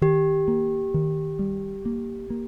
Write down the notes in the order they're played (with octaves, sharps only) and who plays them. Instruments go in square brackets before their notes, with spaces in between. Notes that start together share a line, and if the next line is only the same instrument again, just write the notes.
[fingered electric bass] D#3 [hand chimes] G4
[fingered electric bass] A#3
D#3
G3
A#3
A#3